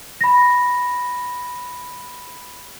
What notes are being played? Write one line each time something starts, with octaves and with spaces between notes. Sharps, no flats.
B5 A#6